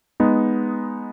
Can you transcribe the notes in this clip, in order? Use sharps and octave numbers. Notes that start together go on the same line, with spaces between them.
G#3 B3 D#4